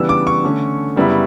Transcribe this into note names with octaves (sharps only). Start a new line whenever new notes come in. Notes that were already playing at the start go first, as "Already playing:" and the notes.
Already playing: C#3 E3 G3 B3 D4 E6
D6
C#6
D3 A3 C#4
F#2 C#3 G3 B3 E4